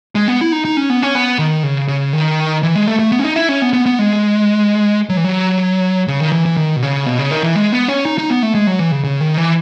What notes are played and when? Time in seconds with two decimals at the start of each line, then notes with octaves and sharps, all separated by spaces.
0.15 G#3
0.28 B3
0.41 E4
0.52 D#4
0.65 D#4
0.77 C#4
0.90 B3
1.02 C#4
1.15 B3
1.39 D#3
1.63 C#3
1.88 C#3
2.13 D#3
2.63 E3
2.75 G#3
2.88 A3
2.99 A3
3.12 B3
3.19 C#4
3.24 D#4
3.36 E4
3.49 C#4
3.62 B3
3.73 B3
3.86 B3
3.99 G#3
5.09 F#3
5.17 E3
5.24 F#3
6.08 C#3
6.20 D#3
6.32 E3
6.46 E3
6.57 D#3
6.76 B2
6.83 C#3
7.06 B2
7.18 C#3
7.31 D#3
7.43 E3
7.56 G#3
7.72 B3
7.88 C#4
8.05 D#4
8.18 D#4
8.30 B3
8.43 A3
8.54 G#3
8.67 F#3
8.79 E3
8.92 C#3
9.04 C#3
9.20 D#3
9.37 E3